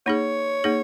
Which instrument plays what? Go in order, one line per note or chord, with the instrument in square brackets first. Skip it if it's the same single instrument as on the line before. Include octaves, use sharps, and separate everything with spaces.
[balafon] A#3 D#4 G#4 [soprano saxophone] C#5
[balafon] A#3 D#4 G#4